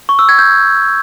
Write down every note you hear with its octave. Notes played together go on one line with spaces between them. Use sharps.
C#6
E6
G#6
G6